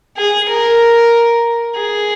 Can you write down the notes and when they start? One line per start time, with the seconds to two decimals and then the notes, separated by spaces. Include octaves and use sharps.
0.17 G#4
0.49 A#4
1.76 G#4